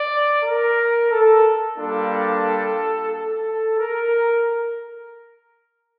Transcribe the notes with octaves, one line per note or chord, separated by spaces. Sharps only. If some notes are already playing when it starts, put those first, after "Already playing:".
Already playing: D5
A#4
A4
G3 A#3 D4 F4 A4
A4
A#4